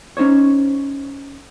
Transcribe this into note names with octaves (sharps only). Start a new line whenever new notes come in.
C#4 D#4 C5 C#5